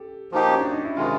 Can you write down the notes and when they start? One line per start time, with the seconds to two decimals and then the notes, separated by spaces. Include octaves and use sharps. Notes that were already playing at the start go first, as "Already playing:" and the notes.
Already playing: G4 A4
0.32 F3 A#3 D#4 F#4 G4
0.49 C#4
0.60 D4
0.72 D#4
0.85 E4
0.96 C3 D#3 G#3 F4